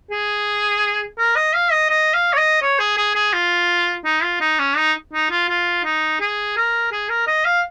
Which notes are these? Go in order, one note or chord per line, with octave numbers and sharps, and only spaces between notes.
G#4
A#4
D#5
F5
D#5
D#5
F5
C#5
D#5
C#5
G#4
G#4
G#4
F4
D#4
F4
D#4
C#4
D#4
D#4
F4
F4
D#4
G#4
A#4
G#4
A#4
D#5
F5